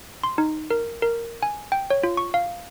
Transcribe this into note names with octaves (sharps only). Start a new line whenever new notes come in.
C6
D#4
A#4
A#4
G#5
G5
C#5
F4
C#6
F5